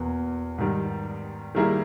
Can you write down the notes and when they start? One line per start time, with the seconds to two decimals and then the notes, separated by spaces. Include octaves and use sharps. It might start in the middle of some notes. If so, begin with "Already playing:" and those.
Already playing: E2 B2 A#3
0.58 G#2 D#3 G3
1.55 D#3 G3 A#3 E4 G#4